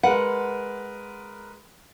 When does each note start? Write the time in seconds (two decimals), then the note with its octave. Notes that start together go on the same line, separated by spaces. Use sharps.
0.03 G#3 A#4 B4 F#5